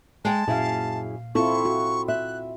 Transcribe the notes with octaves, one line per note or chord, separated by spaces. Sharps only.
G#3 G5 A5
F#2 A#2 E4 G#4 F5
C4 E4 F4 A4 C#6
F#4
E5 F#6